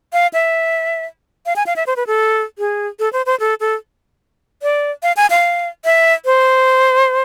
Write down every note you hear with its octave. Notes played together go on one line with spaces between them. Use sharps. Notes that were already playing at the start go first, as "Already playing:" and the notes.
F5
E5
F5
G#5
F5
E5
C5
B4
A4
G#4
A4
C5
C5
A4
A4
D5
F5
G#5
F5
E5
C5